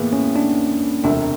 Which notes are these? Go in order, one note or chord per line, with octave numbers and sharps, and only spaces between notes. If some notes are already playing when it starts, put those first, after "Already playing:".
Already playing: A2 E3 G#3 A#3 B3
C#4
D4
E1 D2 C3 D4